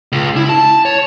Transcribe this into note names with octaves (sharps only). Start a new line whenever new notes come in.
C#2
E4
A5
C#5